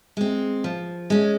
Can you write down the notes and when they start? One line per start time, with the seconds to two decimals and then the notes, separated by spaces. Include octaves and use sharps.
0.17 G#3 C4
0.64 F3
1.10 G#3 C#4